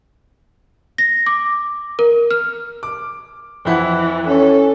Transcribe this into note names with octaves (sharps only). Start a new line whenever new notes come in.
A#6
D6
A#4
F6
D6
F2 E3 E4 F#5
C#4 A4